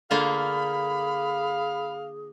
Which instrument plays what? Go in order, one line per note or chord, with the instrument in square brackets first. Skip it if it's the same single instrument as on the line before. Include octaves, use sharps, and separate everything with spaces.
[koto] D3 A#3 F4 [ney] G#4 [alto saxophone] F5 [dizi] B5